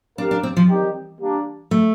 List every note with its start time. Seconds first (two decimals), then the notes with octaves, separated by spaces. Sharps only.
0.18 C4 D4 G4 A#4 F5
0.31 D4
0.43 C4
0.57 F3
0.69 D#3 G3 C4 D#4 G4
1.20 G3 A#3 D4
1.71 A3